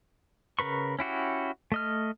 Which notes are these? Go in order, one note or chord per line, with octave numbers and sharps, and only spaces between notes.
C#3 A#4 B4 C#6
C#4 E4 F#4 G4
A3 D#5 F6